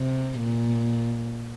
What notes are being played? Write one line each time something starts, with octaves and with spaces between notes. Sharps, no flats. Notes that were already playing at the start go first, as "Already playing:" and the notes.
Already playing: C3
A#2